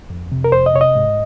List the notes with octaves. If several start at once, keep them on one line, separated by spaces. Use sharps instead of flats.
F2
C3
A#4
F2 C5
D#5
C3 C#5
D#5
G#2